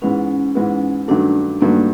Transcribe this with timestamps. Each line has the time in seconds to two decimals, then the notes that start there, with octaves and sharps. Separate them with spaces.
0.02 G#2 E3 G#3 B3 C#4
0.55 G#2 E3 G#3 B3
1.08 G2 D#3 F#3 A3 D4
1.61 G2 D#3 F#3 A3 A#3